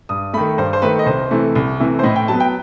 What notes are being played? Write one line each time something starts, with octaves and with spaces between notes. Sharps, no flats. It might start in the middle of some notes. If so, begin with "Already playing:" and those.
G2 D#6
D#3 A3 B5
G2 C5
C5
D#3 A3 B4
D#5
C2 C5
C3 E3 A3
C2
C3 E3 A3
C5
A2 D#5
G5
F#3 B3 A5
G5